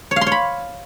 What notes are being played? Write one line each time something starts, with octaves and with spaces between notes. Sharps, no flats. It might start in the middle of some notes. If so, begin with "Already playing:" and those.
C#5
F5
C6
C#5
B5